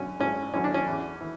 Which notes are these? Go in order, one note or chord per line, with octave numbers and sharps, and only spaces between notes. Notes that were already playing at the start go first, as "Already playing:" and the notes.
Already playing: F#2 D3 C#4
G#1 C#4
F#2 D3 C#4
D4
C#4
E2
E3